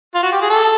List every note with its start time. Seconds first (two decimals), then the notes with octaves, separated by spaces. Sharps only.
0.15 F4
0.23 F#4
0.33 G4
0.42 G#4
0.50 A4